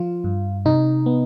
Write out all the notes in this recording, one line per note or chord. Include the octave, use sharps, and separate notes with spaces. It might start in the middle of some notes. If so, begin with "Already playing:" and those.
Already playing: F3 F4
G2
C3 D#4
B3